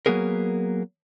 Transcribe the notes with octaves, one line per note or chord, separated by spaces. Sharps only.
F#3 A#3 B3 G#4 A#4